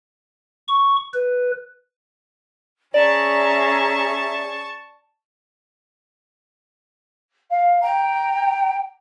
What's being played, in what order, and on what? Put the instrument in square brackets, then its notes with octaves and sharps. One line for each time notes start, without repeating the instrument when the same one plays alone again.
[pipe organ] C#6
B4
[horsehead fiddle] C#4 G#4 [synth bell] D5 [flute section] E5 A#5 [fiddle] A5 C#6
[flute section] F5
G5 A#5